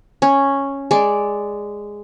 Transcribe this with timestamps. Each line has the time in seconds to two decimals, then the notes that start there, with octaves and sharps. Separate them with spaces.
0.22 C#4
0.91 G#3 D5